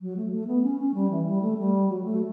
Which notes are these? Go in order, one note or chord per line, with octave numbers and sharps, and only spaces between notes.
F#3
A3
A3
B3
C#4
C#4
G3
E3
G3
A3
G3
F#3
A3